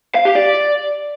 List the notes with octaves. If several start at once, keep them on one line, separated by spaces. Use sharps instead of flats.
F5
G4
D5